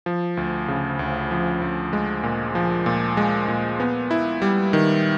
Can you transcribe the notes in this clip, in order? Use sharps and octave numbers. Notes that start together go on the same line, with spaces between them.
F3
D2
C#3
D2
F3
D2
G#3
A#2
F3
A#2
G#3
A#2
B3
E4
G3
D#3